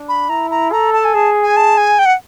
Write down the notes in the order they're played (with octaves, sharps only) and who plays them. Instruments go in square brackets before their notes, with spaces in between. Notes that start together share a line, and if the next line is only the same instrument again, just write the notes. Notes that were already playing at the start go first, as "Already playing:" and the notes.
Already playing: [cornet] D4
[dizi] B5
[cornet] E4 [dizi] A#5
[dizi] A#5
[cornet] A4 [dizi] A#5
[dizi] A5
G#5
[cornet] G#4 [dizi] A5
[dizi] G#5
A5
G#5
G5
F#5